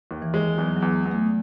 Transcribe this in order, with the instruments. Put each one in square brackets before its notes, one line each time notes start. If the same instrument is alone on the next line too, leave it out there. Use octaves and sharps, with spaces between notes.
[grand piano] D#2
[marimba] E3
[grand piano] G#3
[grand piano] E2 [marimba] F#3
[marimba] F#3
[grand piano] E2
[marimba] G#3
[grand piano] E2
[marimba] A3